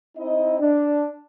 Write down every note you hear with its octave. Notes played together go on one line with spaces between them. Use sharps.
C4 D#4 E4 D#5
D4